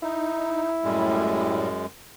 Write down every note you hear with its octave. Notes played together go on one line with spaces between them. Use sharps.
D#4 E4
F#2 A2 G3 G#3